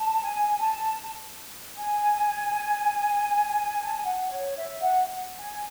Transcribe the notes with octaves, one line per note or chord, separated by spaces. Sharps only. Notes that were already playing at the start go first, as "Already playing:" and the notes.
Already playing: A5
G#5
A5
G#5
A5
G#5
F#5
C#5
E5
F#5
G#5